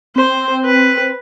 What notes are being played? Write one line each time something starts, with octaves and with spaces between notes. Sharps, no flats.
C4 C5
B4